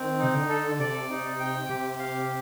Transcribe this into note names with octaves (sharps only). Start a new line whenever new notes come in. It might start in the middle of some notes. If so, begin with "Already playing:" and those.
Already playing: D#3 C4
C3 D#4
D3
A4
C3 D5
D#4
G5
C3 G4
F5